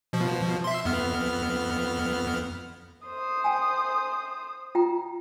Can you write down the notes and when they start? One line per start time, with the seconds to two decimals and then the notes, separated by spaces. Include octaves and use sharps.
0.13 B2 F3
0.64 E5 C6
0.85 F2 B3 F6
3.06 C5 D#6
3.44 G5 G#5
4.75 F4 G5 A#5